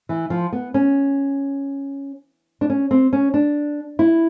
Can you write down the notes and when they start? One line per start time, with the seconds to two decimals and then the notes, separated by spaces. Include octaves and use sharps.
0.09 E3
0.30 F3
0.52 B3
0.74 C#4
2.61 D4
2.70 C#4
2.91 C4
3.13 C#4
3.34 D4
3.99 E4